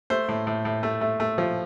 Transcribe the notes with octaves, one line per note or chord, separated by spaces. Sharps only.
A3 C5
A2
A2
A2
A3
A3
A3
F3